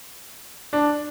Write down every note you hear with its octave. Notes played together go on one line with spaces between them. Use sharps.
D4